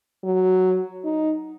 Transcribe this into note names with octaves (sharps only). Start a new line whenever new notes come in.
F#3
D#4